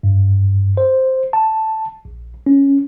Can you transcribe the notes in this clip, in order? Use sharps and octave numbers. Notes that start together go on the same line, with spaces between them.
G2
C5
A5
A#1
C#4